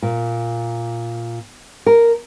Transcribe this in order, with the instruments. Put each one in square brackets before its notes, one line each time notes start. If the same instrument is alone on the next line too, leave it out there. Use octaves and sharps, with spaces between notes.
[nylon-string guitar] A#2
A#4